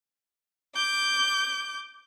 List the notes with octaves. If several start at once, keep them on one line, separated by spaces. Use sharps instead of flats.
D6 G6